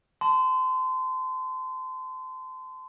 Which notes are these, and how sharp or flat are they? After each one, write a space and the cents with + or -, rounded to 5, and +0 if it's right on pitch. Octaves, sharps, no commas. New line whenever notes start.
A5 +0 C6 -30